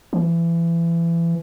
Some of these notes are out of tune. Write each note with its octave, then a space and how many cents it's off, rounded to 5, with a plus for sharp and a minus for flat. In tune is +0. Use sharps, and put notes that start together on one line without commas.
E3 +30